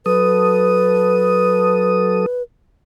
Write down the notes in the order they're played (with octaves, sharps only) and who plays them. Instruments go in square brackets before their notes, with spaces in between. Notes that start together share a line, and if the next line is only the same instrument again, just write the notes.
[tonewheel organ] F#3 A4 D#6 [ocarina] B4